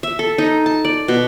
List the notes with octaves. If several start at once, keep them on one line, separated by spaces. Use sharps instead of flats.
E5
A4
D#4
A5
D5
B2